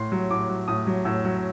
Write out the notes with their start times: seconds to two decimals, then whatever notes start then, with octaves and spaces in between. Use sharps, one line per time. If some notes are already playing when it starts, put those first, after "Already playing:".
Already playing: A2 C6
0.12 F#3
0.30 A2 D6
0.49 F#3
0.68 A2 D#6
0.87 F#3
1.05 A2 E6
1.25 F#3